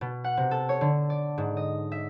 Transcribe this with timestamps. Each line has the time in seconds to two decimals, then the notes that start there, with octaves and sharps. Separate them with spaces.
0.01 B2
0.24 F#5
0.37 C3
0.51 A4
0.69 C#5
0.81 D3
1.10 D5
1.38 G#2
1.57 D#5
1.92 E5